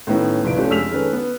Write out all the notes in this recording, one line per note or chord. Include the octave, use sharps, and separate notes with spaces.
A2 D#3 B3 C#4
F#1 C2 F3 B4 D7
C3 A3 C#4 D4 F4 G4
F2 G#3 E6 F6 B6 F7
D#3 G#3 C#4 A4 B4
B3